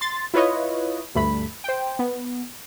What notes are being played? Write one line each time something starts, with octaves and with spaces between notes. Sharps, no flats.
C6 A6
E4 F4 B4 C#5 D#5
D2 G2 A3 B5
C5 G5
B3